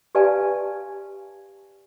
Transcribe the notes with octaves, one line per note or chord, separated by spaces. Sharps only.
G4 B4 D5 F5 G#5 A5